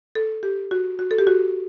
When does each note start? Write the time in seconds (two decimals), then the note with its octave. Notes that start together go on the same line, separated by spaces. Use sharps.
0.15 A4
0.43 G4
0.71 F#4
0.99 F#4
1.11 A4
1.18 G4
1.27 F#4